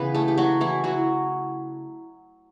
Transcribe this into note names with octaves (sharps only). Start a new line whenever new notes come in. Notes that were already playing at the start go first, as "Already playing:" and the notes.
Already playing: C#3 E3 B3 B4
A3 A4
G4
F#3 F#4
E3 E4
F#3 F#4